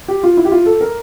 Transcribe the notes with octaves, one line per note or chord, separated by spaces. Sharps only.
G4
F4
E4
G4
F4
A4
A#4